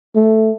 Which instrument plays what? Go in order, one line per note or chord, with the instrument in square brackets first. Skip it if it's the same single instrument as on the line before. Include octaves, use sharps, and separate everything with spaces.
[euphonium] A3